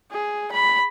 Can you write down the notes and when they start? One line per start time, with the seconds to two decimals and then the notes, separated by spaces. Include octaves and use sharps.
0.12 G#4
0.52 B5